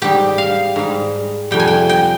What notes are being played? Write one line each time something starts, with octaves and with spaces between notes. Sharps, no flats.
G#2 G3 G4
F5
G#2 G3
F2 C3 G3 G5
G#5
G5
G5